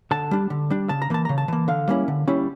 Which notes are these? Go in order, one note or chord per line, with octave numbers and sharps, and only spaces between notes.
D3 A5
G3 D4
D3
G3 D4
C#3 A5
A#5
E3 A#3 A5
C#3 A#5
A5
E3 A#3
D3 F5
G3 A#3 C#4 E4
D3
G3 A#3 C#4 E4